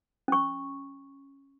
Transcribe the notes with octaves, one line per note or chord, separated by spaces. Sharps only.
C#4 C#6